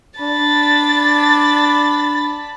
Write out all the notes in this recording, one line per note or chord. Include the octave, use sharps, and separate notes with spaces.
D4 A5 B5 A6